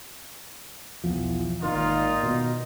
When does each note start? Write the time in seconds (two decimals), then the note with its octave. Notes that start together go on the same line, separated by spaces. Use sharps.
1.04 B1 E2 F3
1.63 G#1 A#2 D#3 D#4 F4
2.23 B2